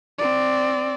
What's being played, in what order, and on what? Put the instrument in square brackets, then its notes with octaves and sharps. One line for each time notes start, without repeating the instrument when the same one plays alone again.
[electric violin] C4 D5